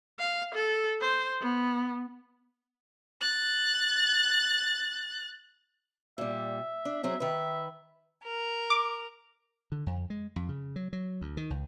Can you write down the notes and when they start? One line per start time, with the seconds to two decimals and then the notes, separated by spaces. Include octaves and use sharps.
0.19 F5
0.54 A4
1.01 C5
1.40 B3
3.21 F#6 A6
6.18 A#2 G3 E5
6.85 D4
7.03 F#3 C4 G#4 E5
7.20 D#3 B4 E5
8.23 A#4
8.70 D6
9.72 D3
9.86 F2
10.10 G#3
10.36 F2
10.49 C#3
10.76 F#3
10.93 F#3
11.21 D2
11.37 D#3
11.50 C#2